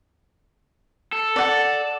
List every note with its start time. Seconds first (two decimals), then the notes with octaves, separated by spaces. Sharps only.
1.12 A4
1.36 D5 F#5